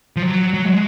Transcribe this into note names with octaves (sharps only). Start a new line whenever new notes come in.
F3
F#3
F#3
G#3